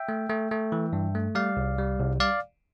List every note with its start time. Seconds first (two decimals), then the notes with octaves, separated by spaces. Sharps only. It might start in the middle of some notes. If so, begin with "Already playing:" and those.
Already playing: E5 G5
0.09 A3
0.29 A3
0.51 A3
0.72 E3
0.93 G2
1.15 A3
1.35 G3 D5 F5
1.57 C2
1.78 G3
1.99 C2
2.20 D5 F5